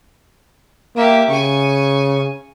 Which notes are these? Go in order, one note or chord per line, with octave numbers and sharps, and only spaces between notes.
A#3 G4 E5
C#3 G#5 C#6